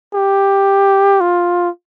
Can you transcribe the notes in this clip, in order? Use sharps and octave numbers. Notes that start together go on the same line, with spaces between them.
G4
F4